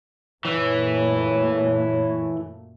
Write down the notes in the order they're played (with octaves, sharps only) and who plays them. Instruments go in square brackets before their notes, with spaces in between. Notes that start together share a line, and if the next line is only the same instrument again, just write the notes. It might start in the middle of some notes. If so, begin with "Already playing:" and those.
[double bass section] F#2 A#2 A3 [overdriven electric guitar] E3 [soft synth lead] C#5